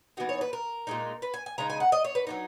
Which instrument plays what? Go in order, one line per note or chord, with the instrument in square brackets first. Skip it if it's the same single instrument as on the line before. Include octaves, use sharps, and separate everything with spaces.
[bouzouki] E3 B3 D#4 F#4
C#5
B4
A#4
A#2 G#3 D#4
B4
G#5
G#5
C#3 G#3 D#4 A#5
G#5
F#5
D#5
C#5
B4
F#3 B3 D#4